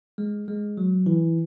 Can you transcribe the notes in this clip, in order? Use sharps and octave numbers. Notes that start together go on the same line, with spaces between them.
G#3
G#3
F#3
E3